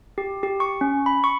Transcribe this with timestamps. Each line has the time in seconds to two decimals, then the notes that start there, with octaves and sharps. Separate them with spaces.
0.18 G4
0.43 G4
0.60 C#6
0.81 C#4
1.06 B5
1.24 C#6